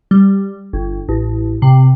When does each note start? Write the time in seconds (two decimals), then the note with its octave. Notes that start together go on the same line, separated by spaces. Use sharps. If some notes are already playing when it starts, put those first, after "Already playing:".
0.11 G3
0.73 G1
1.09 A1
1.62 C3